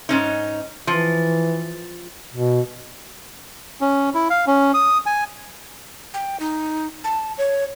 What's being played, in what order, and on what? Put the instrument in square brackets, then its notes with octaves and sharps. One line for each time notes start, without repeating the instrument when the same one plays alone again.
[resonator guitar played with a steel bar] G#2 C#4 D#4
[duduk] E3 [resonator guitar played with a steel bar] F3
[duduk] B2
[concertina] C#4
E4
F5
C#4
D#6
G#5
[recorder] G5
D#4
A5
C#5